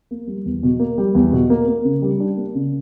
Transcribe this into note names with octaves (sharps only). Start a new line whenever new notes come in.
A#3
G3
E2
B2
A#3
G3
E2
B2
A#3
A#3
C#3
G3
D4
A#3
C#3